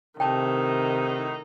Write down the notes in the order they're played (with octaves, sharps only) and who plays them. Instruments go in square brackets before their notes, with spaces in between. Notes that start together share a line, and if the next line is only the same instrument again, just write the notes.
[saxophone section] A2 D#4 [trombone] C3 [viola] D#3 [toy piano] G5 A5